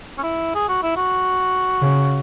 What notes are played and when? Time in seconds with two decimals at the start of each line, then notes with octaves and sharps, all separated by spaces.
0.18 C#4
0.23 E4
0.55 G#4
0.69 F#4
0.83 E4
0.97 F#4
1.82 C#3